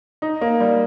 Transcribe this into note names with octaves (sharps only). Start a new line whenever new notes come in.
D#4
A#3
G3